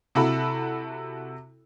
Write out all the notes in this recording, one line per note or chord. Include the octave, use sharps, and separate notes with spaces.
C3 E4 F#4 A4 B5